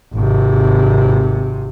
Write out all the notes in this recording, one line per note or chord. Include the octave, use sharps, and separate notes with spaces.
G#1 C3